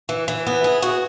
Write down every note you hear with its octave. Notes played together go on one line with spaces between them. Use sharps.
E3
E3
B3
G#4
F#4